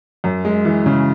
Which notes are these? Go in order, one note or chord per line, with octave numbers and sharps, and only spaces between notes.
F#2
G#3
E3
C#3